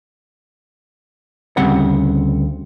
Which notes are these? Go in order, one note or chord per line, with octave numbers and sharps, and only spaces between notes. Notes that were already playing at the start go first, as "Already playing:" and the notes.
D2 C#3 G3 C4 F#5 B5